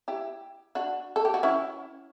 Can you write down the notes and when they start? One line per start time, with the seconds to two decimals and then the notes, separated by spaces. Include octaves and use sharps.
0.08 E4 G4
0.75 D4 F#4
1.16 A4
1.25 G4
1.34 F#4
1.43 C#4 E4